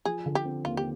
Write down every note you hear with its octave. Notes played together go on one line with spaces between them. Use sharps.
F3 G#4
D3
G4
C4
D#2 F4
G4